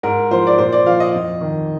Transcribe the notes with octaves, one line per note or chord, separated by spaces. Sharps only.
G#2 A#4
F3 C5
D5
A#2 C5
D5
F3 F5
D#5
F2
D#3